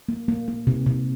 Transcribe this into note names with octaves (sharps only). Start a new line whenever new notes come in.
A#3
A#3
A#3
C3
C3